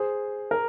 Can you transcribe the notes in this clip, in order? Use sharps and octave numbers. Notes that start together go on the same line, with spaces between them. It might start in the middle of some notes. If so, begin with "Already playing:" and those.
Already playing: G#4 C5
A#4